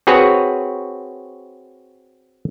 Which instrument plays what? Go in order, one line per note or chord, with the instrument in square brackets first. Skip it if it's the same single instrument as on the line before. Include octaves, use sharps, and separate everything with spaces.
[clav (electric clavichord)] C4 F#4 G#4 B4 C#5